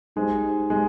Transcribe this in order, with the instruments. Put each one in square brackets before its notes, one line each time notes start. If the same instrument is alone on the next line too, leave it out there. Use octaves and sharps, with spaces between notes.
[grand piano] G#3 [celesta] D#4 G4 C5
[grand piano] G#3 [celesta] D#4 G4 C5